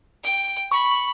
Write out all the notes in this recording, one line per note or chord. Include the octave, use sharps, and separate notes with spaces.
G5
B5 C#6